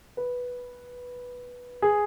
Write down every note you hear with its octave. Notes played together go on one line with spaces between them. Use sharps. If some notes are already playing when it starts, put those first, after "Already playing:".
B4
G#4